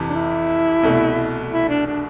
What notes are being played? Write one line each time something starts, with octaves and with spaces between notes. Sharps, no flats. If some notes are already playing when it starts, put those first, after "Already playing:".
Already playing: F2 C3 E3
D4
E4
C2 B2 A3
E4
D4
D4